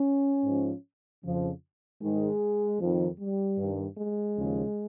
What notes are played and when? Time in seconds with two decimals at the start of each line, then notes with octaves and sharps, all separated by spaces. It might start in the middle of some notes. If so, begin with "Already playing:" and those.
Already playing: C#4
0.44 G#2 F3
1.23 F2 C#3 F3
2.01 G#2 D#3 G#3
2.80 F2 D#3
3.19 G3
3.58 G2 D#3
3.98 G#3
4.37 D#2 C#3 F3